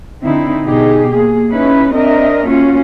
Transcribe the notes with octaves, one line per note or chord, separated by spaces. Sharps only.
D3 C4 D#4 E4
B2 D#4 G4 G#4
A#3 G#4
C#4 D#4 E4 B4
C4 D4 A#4 D#5 E5
A#3 C#4 F4 F#4